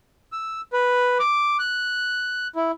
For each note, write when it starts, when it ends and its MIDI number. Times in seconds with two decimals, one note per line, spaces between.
0.32 0.61 88
0.73 1.18 71
1.19 1.57 86
1.59 2.47 90
2.56 2.71 64